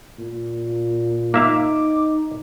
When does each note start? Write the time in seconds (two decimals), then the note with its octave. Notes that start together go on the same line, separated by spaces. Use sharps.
0.18 A#2
1.34 A#3 D#4 E5 F5 D6